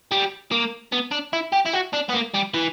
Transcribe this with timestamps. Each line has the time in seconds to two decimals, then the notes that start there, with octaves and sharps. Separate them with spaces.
0.11 G3
0.51 A#3
0.92 B3
1.12 D4
1.33 E4
1.52 G4
1.65 E4
1.73 F#4
1.93 D4
2.09 B3
2.14 A#3
2.34 G3
2.54 E3